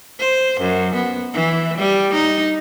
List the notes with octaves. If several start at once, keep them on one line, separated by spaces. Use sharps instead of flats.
C5
F#2
B3
E3
G3
D#4